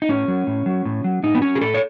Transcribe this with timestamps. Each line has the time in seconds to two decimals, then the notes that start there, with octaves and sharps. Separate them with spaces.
0.02 D#4
0.09 A2 C#4
0.28 F#3
0.47 A2
0.66 F#3
0.85 A2
1.04 F#3
1.23 A2 D#4
1.35 B3
1.42 F#3 C#4
1.55 G#4
1.61 A2 A4
1.74 C#5